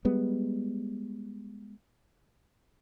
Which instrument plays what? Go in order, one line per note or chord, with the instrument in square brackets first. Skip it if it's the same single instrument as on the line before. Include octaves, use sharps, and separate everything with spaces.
[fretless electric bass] G3 G#3 B3